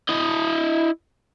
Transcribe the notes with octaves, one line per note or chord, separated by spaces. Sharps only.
E4 D#5